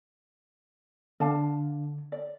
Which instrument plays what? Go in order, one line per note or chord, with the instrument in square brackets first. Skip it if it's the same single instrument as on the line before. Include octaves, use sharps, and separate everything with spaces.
[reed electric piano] D3 [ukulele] D4 F5 A5
[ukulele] D5